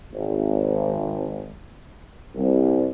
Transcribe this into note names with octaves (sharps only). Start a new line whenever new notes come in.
G#1
C2